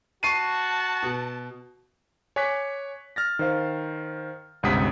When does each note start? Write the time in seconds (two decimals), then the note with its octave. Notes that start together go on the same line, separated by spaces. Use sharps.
0.23 F#4 A5 C#6 C7 D#7
1.03 B2
2.36 C#5 G#5 C#6 D6 F#6 B6
3.16 F6 A6 A#6
3.39 D#3 C5 F5
4.63 G1 C#2 C3 F#5 D#6 B6